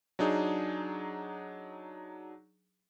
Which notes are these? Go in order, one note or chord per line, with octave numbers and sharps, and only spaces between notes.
F#3 D4 D#4 G#4